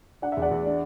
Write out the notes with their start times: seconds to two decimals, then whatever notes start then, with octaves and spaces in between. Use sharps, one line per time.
0.22 D4 F#5
0.32 E5
0.37 E2
0.42 D5 F#5
0.51 E2
0.66 D4